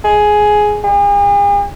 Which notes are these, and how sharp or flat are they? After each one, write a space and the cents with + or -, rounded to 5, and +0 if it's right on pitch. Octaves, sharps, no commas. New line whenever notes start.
G#4 +10
G#4 -45